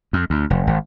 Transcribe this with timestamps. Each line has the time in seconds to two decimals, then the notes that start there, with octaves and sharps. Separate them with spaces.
0.13 F2
0.30 D2
0.50 F1
0.67 G#1